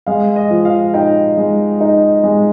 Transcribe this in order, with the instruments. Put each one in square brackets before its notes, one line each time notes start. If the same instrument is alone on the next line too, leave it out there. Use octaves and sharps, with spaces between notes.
[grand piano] G#3 F5
D#5
F3
F5
D#4 G5
G#3
D#4
G#3